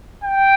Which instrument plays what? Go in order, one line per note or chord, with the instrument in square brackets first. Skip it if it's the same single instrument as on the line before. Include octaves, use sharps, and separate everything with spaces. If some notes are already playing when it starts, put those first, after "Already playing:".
[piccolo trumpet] G5